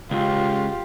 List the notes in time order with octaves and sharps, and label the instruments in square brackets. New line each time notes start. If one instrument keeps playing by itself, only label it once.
[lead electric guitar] C#2 [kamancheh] F4 G4